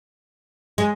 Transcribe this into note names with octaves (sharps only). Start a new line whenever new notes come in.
G#3